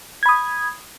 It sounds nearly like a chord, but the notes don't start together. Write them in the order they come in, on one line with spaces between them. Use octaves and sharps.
G#6 B5 D#6